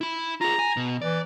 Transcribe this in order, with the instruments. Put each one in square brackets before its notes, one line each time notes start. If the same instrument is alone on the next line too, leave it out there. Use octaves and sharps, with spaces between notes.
[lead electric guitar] E4 B5
[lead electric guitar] F4 G#4 [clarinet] A#5
[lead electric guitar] G#5
B2
[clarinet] E3 [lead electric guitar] D5